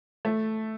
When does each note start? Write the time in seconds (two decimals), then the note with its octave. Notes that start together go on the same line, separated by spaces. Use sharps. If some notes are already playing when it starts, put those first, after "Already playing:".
0.25 A3